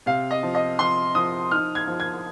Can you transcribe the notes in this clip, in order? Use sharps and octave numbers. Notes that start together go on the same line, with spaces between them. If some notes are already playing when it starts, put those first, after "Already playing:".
C3 F5
D#5
F3
D#5
F3 C6
F3 D#6
D#4 F6
G#6
F3
G#6